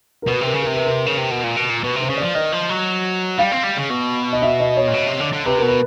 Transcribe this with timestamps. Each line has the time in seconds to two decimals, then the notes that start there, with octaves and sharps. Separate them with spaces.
0.22 A#4
0.27 B2 B4
0.41 C3 A#4
0.54 C#3
0.62 C3 A#4
0.74 B4
0.85 A#4
1.06 C#3
1.18 C3
1.31 B2
1.44 A#2
1.56 B2
1.70 A#2
1.83 B2 B4
1.96 C3 C5
2.09 C#3
2.17 F3 D5
2.35 D#3 D#5
2.53 F3
2.70 F#3
3.38 G3 F5
3.52 C4
3.64 G3
3.77 C#3
3.90 B2
4.33 D#5
4.42 E5
4.60 D#5
4.77 C#5
4.88 A#2
4.94 B2
5.07 C3
5.21 D3
5.33 D3
5.46 C3 B4
5.57 A#4
5.63 B2
5.68 B4